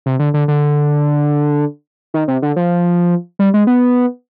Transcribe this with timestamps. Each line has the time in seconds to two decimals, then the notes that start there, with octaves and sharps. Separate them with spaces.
0.06 C3
0.19 D3
0.34 D3
0.48 D3
2.14 D#3
2.28 C3
2.42 D3
2.56 F3
3.39 G3
3.54 G#3
3.67 B3